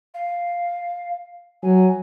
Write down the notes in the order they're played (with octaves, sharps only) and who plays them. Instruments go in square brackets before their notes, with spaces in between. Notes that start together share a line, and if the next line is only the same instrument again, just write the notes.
[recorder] F5
[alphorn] F#3 [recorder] G#5